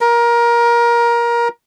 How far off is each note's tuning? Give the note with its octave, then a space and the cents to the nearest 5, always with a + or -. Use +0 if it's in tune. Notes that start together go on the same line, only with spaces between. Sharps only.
A#4 +20